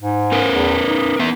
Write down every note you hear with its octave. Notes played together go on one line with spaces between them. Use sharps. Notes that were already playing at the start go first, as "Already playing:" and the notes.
G#2
C#4 A#4 B4
E2
D#4
B3 E5